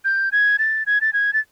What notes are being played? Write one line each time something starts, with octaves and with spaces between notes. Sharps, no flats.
G6
G#6
A6
G#6
A6
G#6
A6